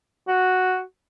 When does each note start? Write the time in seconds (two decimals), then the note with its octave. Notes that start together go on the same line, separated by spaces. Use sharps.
0.27 F#4